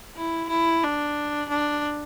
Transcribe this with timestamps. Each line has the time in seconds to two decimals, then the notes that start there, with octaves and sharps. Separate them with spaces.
0.17 E4
0.49 E4
0.83 D4
1.49 D4